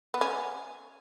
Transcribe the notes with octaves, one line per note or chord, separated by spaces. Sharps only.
B3
C#4